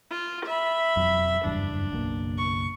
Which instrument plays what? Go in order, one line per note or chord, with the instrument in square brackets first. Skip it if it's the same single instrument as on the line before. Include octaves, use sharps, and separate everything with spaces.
[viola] F4
E5 B5
[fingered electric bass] E1 F2 F#3
[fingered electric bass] F#1 E2 G2 [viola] D4
[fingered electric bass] F#1 B1 A#3
[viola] C#6